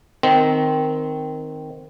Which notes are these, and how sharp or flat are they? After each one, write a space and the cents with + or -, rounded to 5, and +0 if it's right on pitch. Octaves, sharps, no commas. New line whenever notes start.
D#3 +0 C4 -10